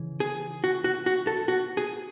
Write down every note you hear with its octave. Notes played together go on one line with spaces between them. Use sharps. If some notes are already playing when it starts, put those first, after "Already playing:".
Already playing: C#3 E3
G#4
F#4
F#4
F#4
A4
F#4
G#4